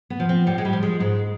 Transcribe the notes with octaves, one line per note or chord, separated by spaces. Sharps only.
B3
F3
C4
A2 G3
G#3
G3
F3
G#3
G#2 G#3